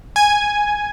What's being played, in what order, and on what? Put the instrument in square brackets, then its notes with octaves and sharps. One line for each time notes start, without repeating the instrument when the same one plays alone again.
[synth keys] G#5